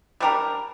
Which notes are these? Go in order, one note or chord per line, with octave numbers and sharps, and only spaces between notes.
G3 D4 G4 A#4